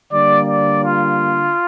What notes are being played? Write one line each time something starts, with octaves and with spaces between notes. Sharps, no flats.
D3 G3 A#3 D5
D5
F4